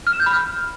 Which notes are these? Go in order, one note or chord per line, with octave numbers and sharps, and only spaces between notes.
F6
E7
G6
B5
F6